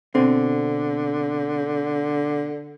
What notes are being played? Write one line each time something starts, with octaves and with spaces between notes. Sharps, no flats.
B2 D3 C4